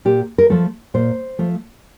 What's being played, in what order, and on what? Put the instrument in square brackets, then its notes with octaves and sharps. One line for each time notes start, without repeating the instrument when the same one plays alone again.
[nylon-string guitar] A#2 G4
A#4
F3 A3 A4
A#2 C5
F3 A3